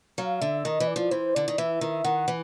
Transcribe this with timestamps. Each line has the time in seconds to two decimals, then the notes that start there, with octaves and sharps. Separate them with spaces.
0.18 F#3 F5
0.41 D3 E5
0.65 D#3 D#5
0.80 E3
0.87 D5
0.96 F3
1.11 E3 C5
1.35 D3 D5
1.48 D#3
1.58 E3 E5
1.81 D#3
2.05 D#3 F#5
2.28 E3